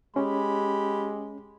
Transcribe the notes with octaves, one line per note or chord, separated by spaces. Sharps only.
G#3 C#4 G4 B5